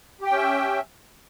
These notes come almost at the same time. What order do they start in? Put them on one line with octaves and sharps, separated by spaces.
G4 G5 C#4 E5